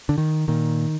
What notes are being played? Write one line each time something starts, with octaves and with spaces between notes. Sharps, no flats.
D3
D#3
A#2 D#3